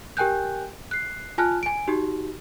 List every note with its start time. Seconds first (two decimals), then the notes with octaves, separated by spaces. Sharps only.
0.17 G4 A#4 G5 G#5 F#6 G6
0.91 F#6 C7
1.38 F4 G#5 A5 F6 F#6
1.63 G#5 D7
1.88 D#4 F#4 G4